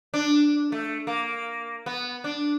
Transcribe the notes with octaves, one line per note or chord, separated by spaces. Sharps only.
D4
A3
A#3
B3
D4